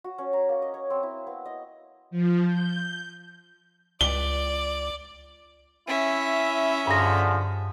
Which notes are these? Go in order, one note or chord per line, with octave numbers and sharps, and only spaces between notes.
F#4
C#4
A#5
A#3
D#5
C#5
C4
E4
B3
D#5
F3
G6
C#2 D5 G7
C#4 E4 E5
G2 D3 F3 G#4 A#6